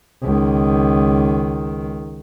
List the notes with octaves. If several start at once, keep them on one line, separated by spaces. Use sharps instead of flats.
C#2 D#3